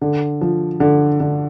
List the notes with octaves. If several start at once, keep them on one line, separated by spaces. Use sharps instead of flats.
D3
F3
D3
D3